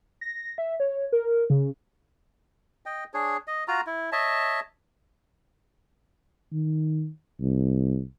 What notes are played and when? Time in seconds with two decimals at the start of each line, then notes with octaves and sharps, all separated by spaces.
0.21 A#6
0.58 E5
0.80 C#5
1.12 A#4
1.50 C#3
2.86 D#5 G5
3.14 D4 G#4 C#5
3.47 D#5
3.68 F4 F#4 A#5
3.86 E4
4.12 C#5 D#5 E5 A5
6.52 D#3
7.40 C2